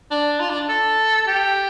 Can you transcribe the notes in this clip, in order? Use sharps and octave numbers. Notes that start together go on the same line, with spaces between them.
D4
F4
D4
A4
G4